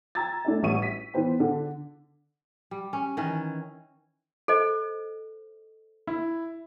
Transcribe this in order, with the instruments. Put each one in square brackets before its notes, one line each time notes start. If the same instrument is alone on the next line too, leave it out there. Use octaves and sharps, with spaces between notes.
[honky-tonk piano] G5 A#5 E6 G#6 A6
A3 D4 E4 E5
A1 G3 E5 C#6 D#7
B6
E3 B3 C5 G5
D3 D4
[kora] G3
C#4
D#3 E3 C#4
[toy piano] A4 C5 D#5
[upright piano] E4